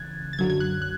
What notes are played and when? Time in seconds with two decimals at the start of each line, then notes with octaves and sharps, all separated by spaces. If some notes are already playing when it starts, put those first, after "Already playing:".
Already playing: C#3 E3 F#6 G#6 A6
0.33 A6
0.39 F#2 D3 F#3 G#6
0.50 G#6
0.60 F#6
0.82 F#6